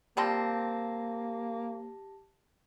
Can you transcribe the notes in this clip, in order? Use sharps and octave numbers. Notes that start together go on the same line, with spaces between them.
F3 G3 A#3 C4 G4 A5 A#6